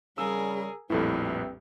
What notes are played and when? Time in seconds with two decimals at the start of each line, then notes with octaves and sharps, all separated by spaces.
0.18 C#3 G3 G#4 A#4 E6
0.90 A#1 F2 A2 E3 G3 C4 E4 A4